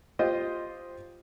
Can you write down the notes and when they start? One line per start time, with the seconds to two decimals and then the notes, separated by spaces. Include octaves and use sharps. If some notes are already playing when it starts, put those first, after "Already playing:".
0.19 F4 G4 C5 D#5